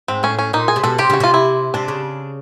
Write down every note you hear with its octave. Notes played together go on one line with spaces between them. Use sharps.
G#2 C4
A2 C#4
C#4
A#2 D#4
G#4
C3
B2 A4
C3 G4
C#3 F#4
C3 F4
E4
C3 D4
C#3